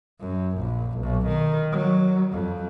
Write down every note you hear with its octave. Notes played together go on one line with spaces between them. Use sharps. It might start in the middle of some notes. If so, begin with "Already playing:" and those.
F#2
A#1
B1
D#3
F#3
F2